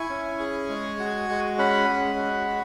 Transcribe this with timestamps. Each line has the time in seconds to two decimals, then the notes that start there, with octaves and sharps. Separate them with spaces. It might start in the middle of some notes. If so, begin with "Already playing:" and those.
Already playing: E4 G#5 C#6
0.09 C#4
0.39 G#4
0.69 G#3
0.99 F#4
1.29 G#3
1.58 C#4 F#5 B5
1.89 G#3
2.19 F#4
2.48 F#4